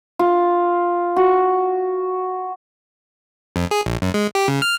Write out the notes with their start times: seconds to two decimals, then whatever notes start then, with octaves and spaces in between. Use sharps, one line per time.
0.19 F4
1.16 F#4
3.56 F2
3.71 G#4
3.86 A#1
4.02 F#2
4.14 G#3
4.35 G4
4.48 C#3
4.62 F6